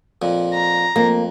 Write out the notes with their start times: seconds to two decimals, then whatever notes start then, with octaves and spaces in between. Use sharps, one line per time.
0.22 F2 A#2
0.54 A#5
0.96 F2 A#3